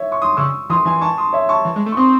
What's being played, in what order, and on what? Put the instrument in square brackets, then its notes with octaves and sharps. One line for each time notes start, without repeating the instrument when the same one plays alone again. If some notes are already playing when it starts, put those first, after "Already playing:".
Already playing: [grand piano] C#5 E5
C#6
C6 D#6
[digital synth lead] C#3 [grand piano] C#6 E6
[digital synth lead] E3 [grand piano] C6 D#6
[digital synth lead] E3 [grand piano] G#5 C6
[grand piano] A5 C#6
C6 D#6
C#5 E5
A5 C#6
[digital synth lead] E3
G#3
A3
[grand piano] C#6
[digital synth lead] C4 [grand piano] C6 D#6